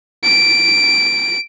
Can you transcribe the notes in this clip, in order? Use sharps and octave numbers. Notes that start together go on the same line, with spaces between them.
D7